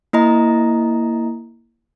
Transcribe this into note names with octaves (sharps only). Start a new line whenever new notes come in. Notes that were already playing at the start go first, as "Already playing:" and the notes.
A#3 E4 D#5 A#5